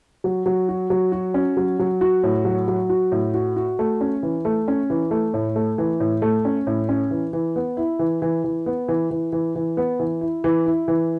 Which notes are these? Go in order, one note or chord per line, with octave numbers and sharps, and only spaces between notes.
F#3
F#3
F#4
F#3
F#4
C#4
F#3
F#3
F#4
A2
F#3
F#3
F#4
A2
F#4
F#4
A3
C#4
E3
A3
C#4
E3
A3
A2
A3
E3
A2
A3
C#4
A2
C#4
E3
E3
B3
E4
E3
E3
E3
B3
E3
E3
E3
E3
B3
E3
E4
E3
E4
E3